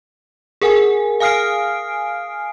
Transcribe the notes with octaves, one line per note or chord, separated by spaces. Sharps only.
G#4 A#4 F#5 G#5
F5 G#5 D#6 F6 C7 D7